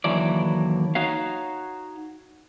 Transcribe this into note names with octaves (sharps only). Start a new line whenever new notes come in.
D#2 D3 E3 F#3 E4 D5
D#4 F#4 C#5 F5